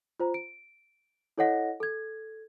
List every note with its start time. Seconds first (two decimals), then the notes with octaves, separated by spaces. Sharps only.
0.20 F4 C5 A#5
0.34 D7
1.38 E4 A4 C#5 D#5 F#5 A#6
1.80 A4 G#6